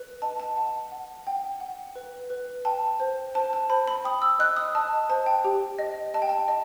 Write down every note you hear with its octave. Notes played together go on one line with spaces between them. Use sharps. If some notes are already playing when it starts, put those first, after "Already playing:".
Already playing: B4
D#5 A5
A5
F#5
F#5
F#5 G5
F#5
B4
B4
G5 A5
C5
C5 A5
A5
C5 B5
B5
G5 D#6
E6
D#5 F#6
D#6
D#5 A5
C5 A5
G5
G4
D#5
D#5 A5
G5
A5
D#5